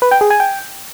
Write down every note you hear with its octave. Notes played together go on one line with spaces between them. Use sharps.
B4
G5
G#4
G#5
G5